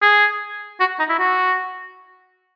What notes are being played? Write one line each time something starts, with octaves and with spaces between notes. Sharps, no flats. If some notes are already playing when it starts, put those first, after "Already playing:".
G#4
F#4
D#4
E4
F#4